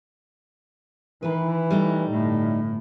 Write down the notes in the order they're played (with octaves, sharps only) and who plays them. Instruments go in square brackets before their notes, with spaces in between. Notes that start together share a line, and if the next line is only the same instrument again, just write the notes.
[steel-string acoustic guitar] D#3 B4 [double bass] E3
[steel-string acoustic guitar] G3 A3 D#4
[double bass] G1 A2